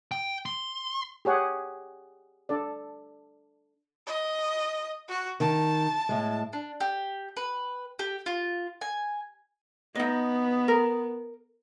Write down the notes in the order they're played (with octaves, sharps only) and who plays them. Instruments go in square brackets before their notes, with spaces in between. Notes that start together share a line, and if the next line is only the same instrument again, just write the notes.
[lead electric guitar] G5
C6
[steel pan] G4 G#4 C#5 F#5
D4 A4 D5
[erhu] D#5
F#4
[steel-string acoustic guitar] D#3 [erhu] A5
[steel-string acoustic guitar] A2 G#3
[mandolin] D4
G4
B4
G4
F4
G#5
[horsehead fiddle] B3 [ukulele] D#4 D#5
[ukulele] A#4